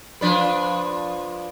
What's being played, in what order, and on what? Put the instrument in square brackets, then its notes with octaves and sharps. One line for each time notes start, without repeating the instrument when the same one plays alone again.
[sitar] F3 D4 B4